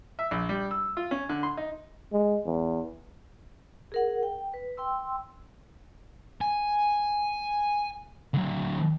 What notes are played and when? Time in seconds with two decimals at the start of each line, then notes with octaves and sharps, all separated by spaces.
0.19 E5
0.31 A#1
0.49 G3
0.71 E6
0.97 F4
1.11 C#4
1.29 D3
1.43 C6
1.57 D#4
2.13 G#3
2.46 E2
3.92 G#4 A#4 F#5
4.23 G5
4.54 B4
4.77 G5 C6 E6
6.41 G#5
8.34 D3 F#3